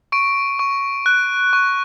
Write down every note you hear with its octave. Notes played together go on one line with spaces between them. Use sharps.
C#6 D7
C#6
F#6
C#6